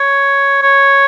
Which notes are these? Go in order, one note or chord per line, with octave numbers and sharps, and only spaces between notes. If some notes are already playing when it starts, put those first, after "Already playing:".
Already playing: C#5
C#5